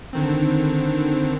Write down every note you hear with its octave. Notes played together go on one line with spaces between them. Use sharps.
D3 D#3 C4